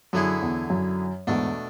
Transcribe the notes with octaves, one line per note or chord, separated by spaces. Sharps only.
F#2 D3 F#3 B3 E4 G#4
E2
F#2
E2 G#2 B2 A3 D4